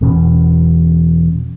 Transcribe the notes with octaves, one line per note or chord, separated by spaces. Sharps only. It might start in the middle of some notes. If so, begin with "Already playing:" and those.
E1 E2 B2 C#4